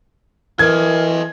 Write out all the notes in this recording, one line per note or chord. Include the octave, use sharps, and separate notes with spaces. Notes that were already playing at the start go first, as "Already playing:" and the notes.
E3 A4 A#4 D#5 G#6